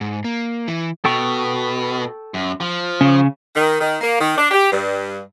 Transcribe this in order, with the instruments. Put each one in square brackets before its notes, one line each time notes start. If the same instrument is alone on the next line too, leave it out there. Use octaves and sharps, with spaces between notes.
[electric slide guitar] G#2
A#3
E3
[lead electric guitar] B2 [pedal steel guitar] A4 G5 C#6
[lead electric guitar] F#2
F3
[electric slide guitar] C#3 [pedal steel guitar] C#4
[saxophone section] D#3
D#3
A#3
D#3
D4
G4
G2